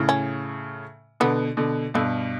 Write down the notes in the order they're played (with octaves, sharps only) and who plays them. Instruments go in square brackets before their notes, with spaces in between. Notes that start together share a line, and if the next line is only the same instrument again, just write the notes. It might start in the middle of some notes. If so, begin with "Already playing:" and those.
Already playing: [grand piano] A2 C#3
[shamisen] C#4
[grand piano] B2 D3 [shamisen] B3
[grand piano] B2 D3
[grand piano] G2 B2 [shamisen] A3